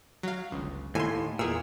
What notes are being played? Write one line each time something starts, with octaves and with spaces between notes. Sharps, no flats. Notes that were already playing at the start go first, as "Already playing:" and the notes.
F#3 F5
G1 C#2
D#2 A2 G#5 C6
E2 A#2 G#4 E6